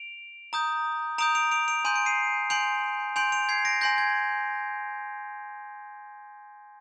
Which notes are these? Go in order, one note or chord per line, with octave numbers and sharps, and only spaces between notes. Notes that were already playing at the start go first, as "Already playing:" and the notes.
Already playing: D7 F7
A#5 D#6 G6
A#5 D#6 G6 D7 F7
D7 F7
D7 F7
D7 F7
G#5 C6 G6 D#7
D7
C7 D#7
G#5 C6 G6 D7 F7
G#5 C6 G6 D7 F7
D7 F7
G#6 C7
A#6 D7
G#5 C6 G6 A#6
G#6